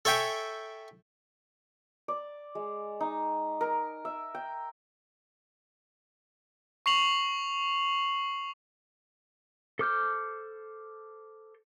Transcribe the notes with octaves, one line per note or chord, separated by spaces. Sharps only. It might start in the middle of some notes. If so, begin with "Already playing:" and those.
A4 C#5 E5 G5 G#5
D5
G#3
D#4
A#4
E5
G5
C#6 C7 F7 F#7
A4 C5 D6 F6 G6